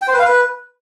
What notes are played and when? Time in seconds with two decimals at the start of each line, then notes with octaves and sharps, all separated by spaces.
0.02 G5
0.08 C5
0.13 B4
0.19 F5
0.25 B4